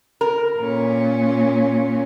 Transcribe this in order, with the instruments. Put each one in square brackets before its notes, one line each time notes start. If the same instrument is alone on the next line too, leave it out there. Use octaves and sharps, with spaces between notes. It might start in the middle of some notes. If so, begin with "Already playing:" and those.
[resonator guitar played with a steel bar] A#4
[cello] A#2 C#4